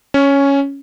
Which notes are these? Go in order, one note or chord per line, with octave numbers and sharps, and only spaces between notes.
C#4